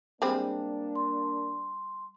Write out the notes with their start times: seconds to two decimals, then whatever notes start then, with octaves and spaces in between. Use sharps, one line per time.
0.22 G3 G#3 A#3 C4 D4
0.95 C6